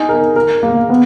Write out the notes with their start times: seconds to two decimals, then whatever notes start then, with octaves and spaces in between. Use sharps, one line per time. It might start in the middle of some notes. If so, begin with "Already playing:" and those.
Already playing: D#4 G#4
0.09 A#4
0.36 A#4
0.63 A#3
0.90 B3